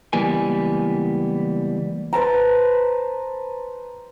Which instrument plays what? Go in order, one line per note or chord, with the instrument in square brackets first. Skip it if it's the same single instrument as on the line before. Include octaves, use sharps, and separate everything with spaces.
[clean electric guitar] C#2 E3 G3 A#3 B3 G#5
[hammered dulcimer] B4 C5 A5 A#5